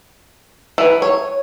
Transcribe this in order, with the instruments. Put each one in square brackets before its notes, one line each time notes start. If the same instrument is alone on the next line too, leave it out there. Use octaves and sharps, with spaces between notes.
[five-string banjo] E3
C#5